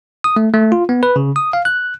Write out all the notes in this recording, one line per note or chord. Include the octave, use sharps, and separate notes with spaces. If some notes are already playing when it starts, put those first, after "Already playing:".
D#6
A3
A3
F4
B3
B4
C#3
D#6
F5
F#6